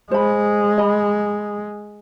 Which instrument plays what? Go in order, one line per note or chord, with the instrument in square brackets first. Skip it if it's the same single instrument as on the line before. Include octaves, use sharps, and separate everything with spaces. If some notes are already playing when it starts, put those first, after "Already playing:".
[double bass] G#3 [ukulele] C5 B5
[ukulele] D#5 B5